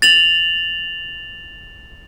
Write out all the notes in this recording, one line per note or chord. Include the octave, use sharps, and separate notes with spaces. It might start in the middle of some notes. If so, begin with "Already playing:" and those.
A6 F7 F#7